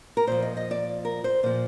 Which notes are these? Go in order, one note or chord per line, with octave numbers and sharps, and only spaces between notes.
A#4
A#2 F3 C5
D#5
D#5
D5
A#4
C5
A#2 F3 C5